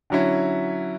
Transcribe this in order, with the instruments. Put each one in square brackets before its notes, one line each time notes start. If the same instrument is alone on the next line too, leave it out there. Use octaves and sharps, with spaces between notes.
[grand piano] D3 F#3 C#4 E4